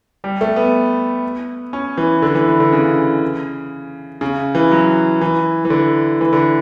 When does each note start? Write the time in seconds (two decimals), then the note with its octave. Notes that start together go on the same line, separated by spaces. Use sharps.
0.24 G3
0.41 A3
0.56 B3
1.73 C#4
1.98 E3
2.22 D3
2.35 E3
2.48 E3
2.60 D3
2.73 C#3
4.21 C#3
4.55 E3
4.71 F#3
5.21 E3
5.65 E3
5.70 D3
6.21 E3
6.33 D3